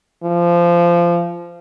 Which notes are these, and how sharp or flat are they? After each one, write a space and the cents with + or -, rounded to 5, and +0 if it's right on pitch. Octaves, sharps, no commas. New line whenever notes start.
F3 -20